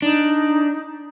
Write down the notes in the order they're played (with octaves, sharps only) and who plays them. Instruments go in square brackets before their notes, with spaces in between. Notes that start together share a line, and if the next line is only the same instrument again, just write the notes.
[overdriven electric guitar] D4 [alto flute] D#4